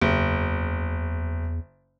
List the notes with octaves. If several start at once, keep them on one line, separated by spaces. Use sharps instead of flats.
F#1 E2